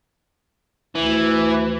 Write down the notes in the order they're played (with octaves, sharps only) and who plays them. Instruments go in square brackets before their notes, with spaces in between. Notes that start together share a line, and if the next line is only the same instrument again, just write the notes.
[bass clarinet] D2 [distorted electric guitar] E3